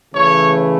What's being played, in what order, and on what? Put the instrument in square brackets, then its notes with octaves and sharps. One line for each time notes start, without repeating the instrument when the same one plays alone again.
[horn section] C#3 E3 A3 C#5